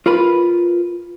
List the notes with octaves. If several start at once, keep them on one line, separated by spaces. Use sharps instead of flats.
F4 A#4 B4 B5